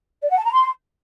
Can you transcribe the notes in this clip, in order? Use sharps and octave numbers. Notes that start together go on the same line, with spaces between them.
D5
F#5
A5
A#5
C6